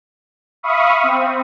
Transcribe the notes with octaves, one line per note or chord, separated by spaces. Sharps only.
E5 F5 B5 C#6 D#6
C4